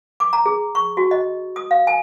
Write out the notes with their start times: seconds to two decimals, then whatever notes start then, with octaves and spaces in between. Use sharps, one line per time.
0.20 D6
0.33 A#5
0.46 G#4
0.75 C#6
0.97 F#4
1.11 D#5
1.56 D#6
1.71 F5
1.87 G#5